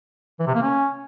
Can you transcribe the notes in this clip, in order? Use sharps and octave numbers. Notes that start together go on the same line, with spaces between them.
E3
C3
A#3
C#4